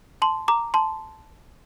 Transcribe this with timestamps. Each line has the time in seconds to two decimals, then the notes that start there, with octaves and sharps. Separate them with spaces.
0.22 A5 C6
0.48 A#5 D6
0.74 A5 C6